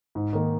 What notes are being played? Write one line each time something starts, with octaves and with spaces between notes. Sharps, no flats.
G#2
D#3 A#3